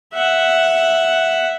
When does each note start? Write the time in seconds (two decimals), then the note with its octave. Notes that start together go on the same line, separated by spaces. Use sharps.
0.14 E5 F#5